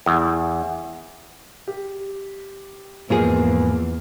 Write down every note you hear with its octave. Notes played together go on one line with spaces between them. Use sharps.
E2
G4
E2 G#2 F3 A#3 G#4 B4